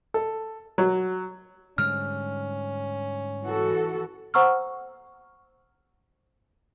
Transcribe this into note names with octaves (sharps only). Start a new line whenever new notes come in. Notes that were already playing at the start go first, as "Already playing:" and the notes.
A4
F#3
G#2 D3 G3 C#4 F6
E3 F#4 A4
C5 F#5 A#5 C#6 E6 F6